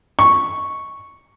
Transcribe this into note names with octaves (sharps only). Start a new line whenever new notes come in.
C#6